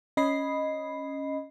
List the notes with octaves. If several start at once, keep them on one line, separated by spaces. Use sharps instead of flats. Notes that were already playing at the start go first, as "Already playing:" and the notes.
C#4 D#5 B5 C7